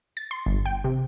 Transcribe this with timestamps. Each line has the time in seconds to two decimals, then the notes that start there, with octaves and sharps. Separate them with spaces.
0.17 A6
0.31 C6
0.46 G1
0.66 G5
0.84 C3